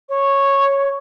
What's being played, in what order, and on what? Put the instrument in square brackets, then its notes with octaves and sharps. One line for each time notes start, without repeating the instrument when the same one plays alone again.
[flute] C#5